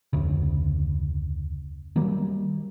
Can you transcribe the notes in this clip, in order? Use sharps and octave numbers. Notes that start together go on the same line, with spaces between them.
F1 D2 C#3
D#3 F#3 G3 A#3